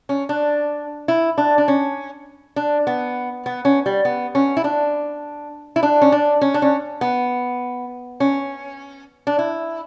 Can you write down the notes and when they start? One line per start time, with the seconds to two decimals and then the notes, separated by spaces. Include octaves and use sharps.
0.09 C#4
0.29 D4
1.08 E4
1.38 D4
1.58 D4
1.68 C#4
2.56 D4
2.87 B3
3.46 B3
3.65 C#4
3.86 G3
4.05 B3
4.35 C#4
4.57 E4
4.64 D4
5.76 E4
5.83 D4
6.02 C#4
6.12 D4
6.41 C#4
6.54 D4
6.62 C#4
7.01 B3
8.20 C#4
9.27 D4
9.39 E4